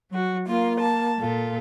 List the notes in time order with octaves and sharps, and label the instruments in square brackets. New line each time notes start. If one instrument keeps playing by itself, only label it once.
[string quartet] F#3 F#4
[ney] A#3 [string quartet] F4
[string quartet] A5
A#2 F4 A4